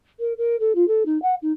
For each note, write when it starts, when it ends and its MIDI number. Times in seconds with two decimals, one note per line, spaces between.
0.19 0.33 70
0.38 0.56 70
0.60 0.72 69
0.75 0.87 65
0.87 1.03 69
1.05 1.20 63
1.22 1.35 78
1.42 1.52 63